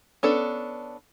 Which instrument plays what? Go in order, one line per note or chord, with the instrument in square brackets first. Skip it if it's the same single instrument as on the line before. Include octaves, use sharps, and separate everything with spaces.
[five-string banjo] B3 C#4 D4 A4